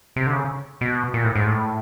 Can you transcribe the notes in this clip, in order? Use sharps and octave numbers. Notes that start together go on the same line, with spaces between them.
C3
D3
C#3
B2
A#2
A2
G#2
A2